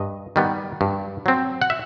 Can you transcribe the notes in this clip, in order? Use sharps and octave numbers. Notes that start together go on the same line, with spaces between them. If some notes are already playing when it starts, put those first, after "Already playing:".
Already playing: G2 D#5
D#3 G3 B3
G2
F#3 C4
F#5
E5